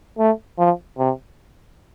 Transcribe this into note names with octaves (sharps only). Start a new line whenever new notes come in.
A3
F3
C3